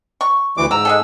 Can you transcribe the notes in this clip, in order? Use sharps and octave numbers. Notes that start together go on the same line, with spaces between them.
C#6
D2 E3 D6
G#2 A#5 E6
G#3 G#4 A4